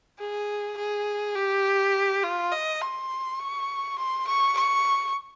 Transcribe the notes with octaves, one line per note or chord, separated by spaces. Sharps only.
G#4
G#4
G4
F4
D#5
C6
C#6
C6
C#6
C#6